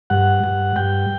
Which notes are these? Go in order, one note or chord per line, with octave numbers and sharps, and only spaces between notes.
G2 F#5
G2
G2 G5